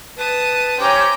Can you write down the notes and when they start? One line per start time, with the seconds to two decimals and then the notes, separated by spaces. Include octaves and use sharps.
0.18 B4 A5 D#6
0.79 C#4 G4 C5 G5 A#5 D6